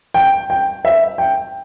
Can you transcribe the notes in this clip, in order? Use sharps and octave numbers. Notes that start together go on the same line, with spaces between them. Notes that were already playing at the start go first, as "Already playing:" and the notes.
G5
G5
E5
G5